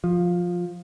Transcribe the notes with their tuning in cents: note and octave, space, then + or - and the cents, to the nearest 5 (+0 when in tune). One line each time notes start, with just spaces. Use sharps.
F3 +10